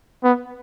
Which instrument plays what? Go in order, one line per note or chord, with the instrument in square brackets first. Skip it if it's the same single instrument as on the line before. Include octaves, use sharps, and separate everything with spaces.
[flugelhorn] B3